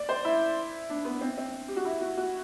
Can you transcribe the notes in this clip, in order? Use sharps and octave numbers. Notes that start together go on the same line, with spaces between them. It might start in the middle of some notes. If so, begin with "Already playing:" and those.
Already playing: D5
C5
E4
D4
B3
C4
C4
G4
F#4
E4
F#4
F#4